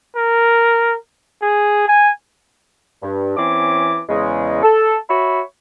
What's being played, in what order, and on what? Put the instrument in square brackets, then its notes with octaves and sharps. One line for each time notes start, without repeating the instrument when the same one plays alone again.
[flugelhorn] A#4
G#4
G#5
[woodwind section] G2
E3 C4 C#4 D6
E2 C#3 G#3
A4
F#4 C#5 E5 B5